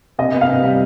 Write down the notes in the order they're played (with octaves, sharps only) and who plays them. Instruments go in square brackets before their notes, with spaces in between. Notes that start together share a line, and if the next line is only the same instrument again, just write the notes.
[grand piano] C3 [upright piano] D#5
[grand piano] B3
[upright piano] F5
[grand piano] C3
G3